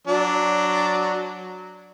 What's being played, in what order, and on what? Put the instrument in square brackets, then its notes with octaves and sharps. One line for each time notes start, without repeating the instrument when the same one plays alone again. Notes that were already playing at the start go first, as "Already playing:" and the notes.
[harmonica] F#3 D4